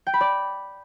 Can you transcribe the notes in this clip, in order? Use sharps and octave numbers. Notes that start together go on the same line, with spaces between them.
G5
B5
D5